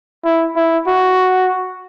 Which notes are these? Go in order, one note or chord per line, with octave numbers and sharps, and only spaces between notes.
E4
E4
F#4